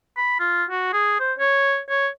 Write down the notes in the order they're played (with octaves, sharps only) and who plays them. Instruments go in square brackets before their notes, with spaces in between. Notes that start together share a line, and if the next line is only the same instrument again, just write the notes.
[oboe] B5
F4
F#4
G#4
C5
C#5
C#5